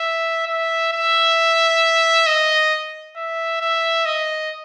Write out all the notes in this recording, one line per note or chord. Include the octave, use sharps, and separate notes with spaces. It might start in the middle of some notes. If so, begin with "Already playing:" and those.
Already playing: E5
E5
E5
D#5
E5
E5
D#5